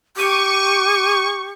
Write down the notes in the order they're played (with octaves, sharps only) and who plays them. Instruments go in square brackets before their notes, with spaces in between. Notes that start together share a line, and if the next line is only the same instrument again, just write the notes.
[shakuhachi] G4 [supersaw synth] C#6 [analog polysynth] D6 D#7